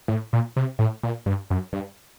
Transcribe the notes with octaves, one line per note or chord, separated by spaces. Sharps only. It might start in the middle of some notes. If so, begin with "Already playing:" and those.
A2
A#2
C3
A2
A#2
G2
F#2
G2